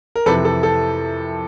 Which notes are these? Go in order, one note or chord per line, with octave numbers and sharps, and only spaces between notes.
A#4
F2 C3 E3 A4 B4
A4
A4